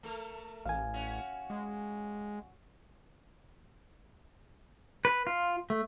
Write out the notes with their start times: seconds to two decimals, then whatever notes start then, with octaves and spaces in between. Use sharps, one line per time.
0.03 A3 A4 A#4
0.66 A1 F5 G#5
0.94 C#4 F#4
1.50 G#3
5.05 B4
5.27 F4
5.70 A3